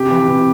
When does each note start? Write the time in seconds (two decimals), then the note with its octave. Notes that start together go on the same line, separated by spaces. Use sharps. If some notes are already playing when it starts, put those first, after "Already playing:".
Already playing: C3 G4
0.10 E3
0.28 C3